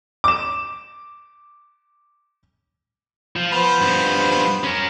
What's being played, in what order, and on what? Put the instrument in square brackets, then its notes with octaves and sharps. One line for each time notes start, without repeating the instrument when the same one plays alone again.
[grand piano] D6 E7
[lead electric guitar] F3
[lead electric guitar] F3 [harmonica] B3 C5 B5
[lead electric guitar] G2 F3
C#4 A#4